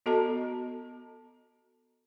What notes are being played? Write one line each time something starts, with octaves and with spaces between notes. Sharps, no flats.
B3 F#4 A4 D#5 A5 A#5